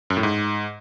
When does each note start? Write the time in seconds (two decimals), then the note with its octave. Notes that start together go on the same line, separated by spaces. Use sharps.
0.10 F#2
0.17 A2
0.23 G#2